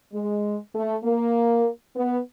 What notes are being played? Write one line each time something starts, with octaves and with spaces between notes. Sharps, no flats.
G#3
A3
A#3
B3